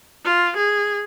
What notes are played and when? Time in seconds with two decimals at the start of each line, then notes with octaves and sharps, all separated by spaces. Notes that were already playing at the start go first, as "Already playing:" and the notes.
0.25 F4
0.57 G#4